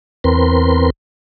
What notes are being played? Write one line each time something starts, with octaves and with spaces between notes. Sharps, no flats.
E2 C4 A#4 B4 C6